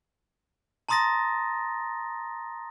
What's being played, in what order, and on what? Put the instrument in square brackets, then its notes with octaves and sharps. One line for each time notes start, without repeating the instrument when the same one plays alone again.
[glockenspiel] A5 A#5 C6 D#6 A6 A#6